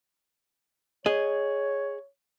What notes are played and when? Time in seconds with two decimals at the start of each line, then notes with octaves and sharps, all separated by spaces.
1.06 G#4 C#5 D#5